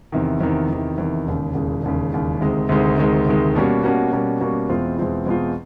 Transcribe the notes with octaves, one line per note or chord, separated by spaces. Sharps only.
E2 C3 D#3
E2 C3 D#3
E2 C3 D#3
E2 C3 D#3
E1 D#2 C#3
E1 D#2 C#3
E1 D#2 C#3
E1 D#2 C#3
D2 C3 D#3 G#3
D2 C3 D#3 G#3
D2 C3 D#3 G#3
D2 C3 D#3 G#3
B2 G3 A#3 C#4 F#4
B2 G3 A#3 C#4 F#4
B2 G3 A#3 C#4 F#4
B2 G3 A#3 C#4 F#4
E2 B2 G#3 C4 F4
E2 B2 G#3 C4 F4
E2 B2 G#3 C4 F4